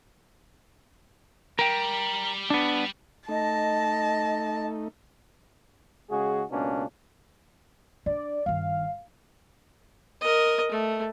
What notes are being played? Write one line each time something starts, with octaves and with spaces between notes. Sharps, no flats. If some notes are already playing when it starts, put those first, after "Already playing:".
G3 A#4 G5
B3 D4
A3 D#4 D#5 A5
C#3 G#3 F#4 G#4
C#2 B2 A#3 C#4 D4
D4 D5
G1 D#3 F5
A#4 D#5
A3